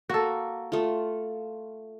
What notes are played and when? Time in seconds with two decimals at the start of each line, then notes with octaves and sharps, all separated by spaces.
0.09 A#3 F#4 A4
0.72 A3 F4